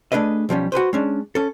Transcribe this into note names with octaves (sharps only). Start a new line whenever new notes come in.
A3 D4 G#4 B4 D#5
B1 F3 G3 C#4
F#4 G#4 B4 C5
G#3 C#4 D4
C#4 A4